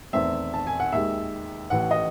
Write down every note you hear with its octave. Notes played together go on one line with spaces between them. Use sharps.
E2 D#3 A3 C4 E5
A5
G#5
F#5
D#2 D#3 G#3 E5
A1 A2 E3 F#5
D#5